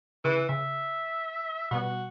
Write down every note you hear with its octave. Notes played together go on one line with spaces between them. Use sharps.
C#3 E3
C#3 E5
B2 G3 B3 F#4